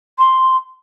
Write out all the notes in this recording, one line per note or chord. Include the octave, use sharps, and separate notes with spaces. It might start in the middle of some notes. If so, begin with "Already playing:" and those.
C6